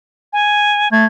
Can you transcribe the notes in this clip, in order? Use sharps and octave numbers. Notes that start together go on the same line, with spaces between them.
G#5
A3 G#6